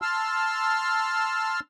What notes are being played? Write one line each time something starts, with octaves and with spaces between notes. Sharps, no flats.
A5 C6 E6 F6